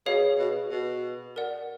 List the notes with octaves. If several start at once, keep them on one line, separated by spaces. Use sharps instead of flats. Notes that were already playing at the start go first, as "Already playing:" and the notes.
B2 G#4 C#5 F5
B2
B2
A#4 D5 F#5